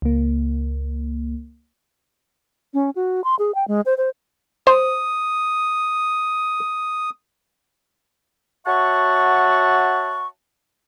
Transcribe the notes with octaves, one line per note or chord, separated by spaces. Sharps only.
C#2 A#3
C#4
F#4
C6
G#4
G5
G#3
C5
C5
C5 D#6
F#4 C#5 E5 F#5 A5 C#6